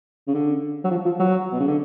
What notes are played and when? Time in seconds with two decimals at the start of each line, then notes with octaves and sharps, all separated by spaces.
0.27 C#3
0.34 D3
0.84 F#3
0.91 F3
1.05 F3
1.19 F#3
1.52 B2
1.60 C#3
1.68 D3